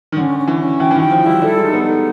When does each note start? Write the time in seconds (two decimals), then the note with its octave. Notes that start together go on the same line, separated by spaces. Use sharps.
0.12 D#3
0.17 D3 C#4
0.38 C#4
0.48 E3
0.58 C#4
0.80 E3 G5
0.91 E3
0.95 D#3
1.00 G5
1.11 F3
1.21 E4
1.26 G3
1.41 G3 A4
1.58 G#3 D#4
1.73 B3
1.84 D#4